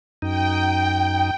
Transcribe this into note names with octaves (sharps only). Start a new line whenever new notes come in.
F#2 D#4 G5